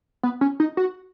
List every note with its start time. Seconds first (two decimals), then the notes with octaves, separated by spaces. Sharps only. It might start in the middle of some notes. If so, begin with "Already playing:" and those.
0.23 B3
0.41 C#4
0.60 D#4
0.77 F#4